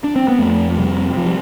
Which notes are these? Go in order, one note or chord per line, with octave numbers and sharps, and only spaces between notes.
D4
C4
B3
F2 A3
C3 G3
F3
G3